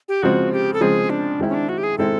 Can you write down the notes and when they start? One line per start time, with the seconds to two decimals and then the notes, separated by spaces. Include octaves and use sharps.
0.08 G4
0.22 C#3 F3 G#3 C4 F#4
0.52 G4
0.73 A4
0.80 C#3 F3 G#3 C4 G#4
1.10 D4
1.39 D#3 G#3 C4 E4
1.49 C#4
1.54 D4
1.69 F#4
1.78 G4
1.84 G#4
1.98 D#3 G#3 C4 E4 A4